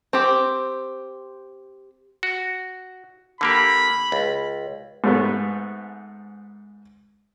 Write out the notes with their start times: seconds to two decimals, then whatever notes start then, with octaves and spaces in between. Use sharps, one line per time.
0.13 C4 G4
2.23 F#4
3.41 D3 A#3 G4 B5
4.12 C#2
5.04 G#2 A3 B3